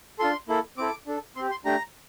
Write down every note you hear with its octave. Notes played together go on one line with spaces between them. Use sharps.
D4 F4 A4 C6
A#3 E4 A4
C4 E4 A4 D6
D4 A4
C4 G4 C6
C6
A3 D4 G4 A#5